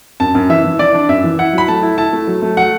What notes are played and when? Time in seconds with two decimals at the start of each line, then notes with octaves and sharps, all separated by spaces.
0.20 F#2 A5
0.35 F#2
0.50 E3 E5
0.64 E3
0.79 E3 D5
0.94 D4
1.09 F#2 E5
1.24 E3
1.39 E4 F#5
1.53 F#3 B5
1.68 A3 A5
1.82 E4
1.98 E4 A5
2.13 A3
2.28 F#3
2.42 A3
2.57 F#3 F#5